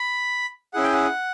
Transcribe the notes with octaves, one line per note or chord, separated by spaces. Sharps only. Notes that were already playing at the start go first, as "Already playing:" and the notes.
Already playing: B5
C#4 E4 G#4 F#5
G5
F#5